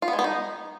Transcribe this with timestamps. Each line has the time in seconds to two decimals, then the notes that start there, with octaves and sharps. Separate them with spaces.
0.02 F4
0.08 B3
0.13 G#3
0.19 B3
0.24 D#4